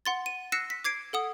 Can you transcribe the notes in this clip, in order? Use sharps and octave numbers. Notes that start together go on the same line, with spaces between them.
F#5 C6 A6
D#7
E6 F#6 A#6 C7 C#7 E7
B6
D6 G#6 C7 D7
A4 F#5 D#6